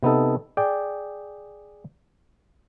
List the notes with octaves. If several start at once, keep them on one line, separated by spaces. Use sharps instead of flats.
C3 B3 D#4 A4
G#4 D5 G5